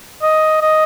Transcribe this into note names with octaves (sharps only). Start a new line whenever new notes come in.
D#5
D#5